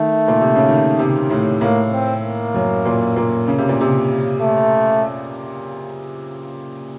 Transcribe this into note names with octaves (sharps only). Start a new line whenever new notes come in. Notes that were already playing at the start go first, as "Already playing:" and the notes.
Already playing: D#3 A3
A#2
C3
C#3
D#3
C3
A2
A2 A#3
C4
A#3
F#2
A#2
A#2
C#3
C3
A#2
C3
A3